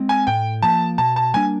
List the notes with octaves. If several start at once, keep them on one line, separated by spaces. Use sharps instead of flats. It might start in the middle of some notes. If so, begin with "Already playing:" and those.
Already playing: G#3 C4
G#5
A2 G5
F3 A#3 A5
B2 A5
A5
G3 A#3 D4 G#5